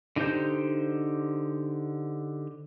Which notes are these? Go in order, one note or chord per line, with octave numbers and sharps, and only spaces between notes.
D3 D#4 G4 C5 G6